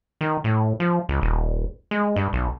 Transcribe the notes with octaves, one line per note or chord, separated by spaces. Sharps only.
D#3
A2
F3
C#2
D#1
G#3
G2
B1